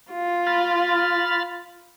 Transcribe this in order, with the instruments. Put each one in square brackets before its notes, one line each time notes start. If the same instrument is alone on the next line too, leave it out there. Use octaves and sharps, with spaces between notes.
[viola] F4
[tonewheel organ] B5 F6 A6